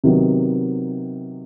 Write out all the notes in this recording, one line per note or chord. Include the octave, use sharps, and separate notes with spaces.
C3 D#3 F#3 B3